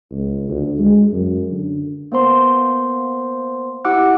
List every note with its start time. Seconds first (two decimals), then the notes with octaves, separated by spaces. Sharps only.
0.11 C#2
0.49 D2
0.79 G#3
1.13 F#2
1.52 D3
2.12 A#3 B3 C5 C6
3.85 E4 G4 F#5 D6 E6 F#6